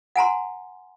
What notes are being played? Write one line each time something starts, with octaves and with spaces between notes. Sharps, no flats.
F#5 G#5 A#5 C6